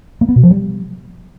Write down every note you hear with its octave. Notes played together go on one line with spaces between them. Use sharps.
A#3
B3
B2
F3
G3